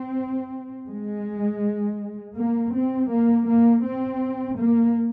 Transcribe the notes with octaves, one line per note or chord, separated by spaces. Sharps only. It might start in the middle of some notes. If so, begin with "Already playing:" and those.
Already playing: C4
G#3
A#3
C4
A#3
A#3
C4
A#3